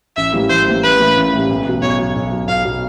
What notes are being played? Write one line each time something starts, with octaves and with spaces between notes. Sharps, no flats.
A1 E5
A2 E3 G3 A#3
A1 C5
A2 E3 G3 A#3
A1 B4
A2 E3 G3 A#3
A1
A2 E3 G3 A#3
B1
B2 F#3
B1 C#5
B2 F#3
B1
B2 F#3
B1 F5
B2 F#3